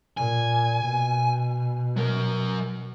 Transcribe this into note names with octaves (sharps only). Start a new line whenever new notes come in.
A#2 G#5
B2
F#3 A#4